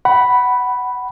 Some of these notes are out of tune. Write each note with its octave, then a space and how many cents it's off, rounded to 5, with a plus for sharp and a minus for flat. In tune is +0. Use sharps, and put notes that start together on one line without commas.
F#5 +25 B5 +0